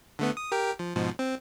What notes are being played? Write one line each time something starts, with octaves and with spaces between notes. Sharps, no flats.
D3 A3 B3
D#6
G4 A#4 G5
F3
G#2 B2 F3
C4